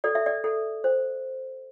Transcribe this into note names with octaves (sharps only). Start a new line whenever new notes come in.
A4 D5
E5
D5
A4
C5